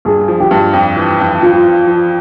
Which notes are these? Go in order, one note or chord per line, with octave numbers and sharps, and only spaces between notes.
G2 G#4
F3
G4
G2
F2
E3
F2
F3 F4
F3
F3